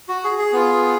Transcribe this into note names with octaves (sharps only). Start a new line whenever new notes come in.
F#4
G#4
G#4
B3 F4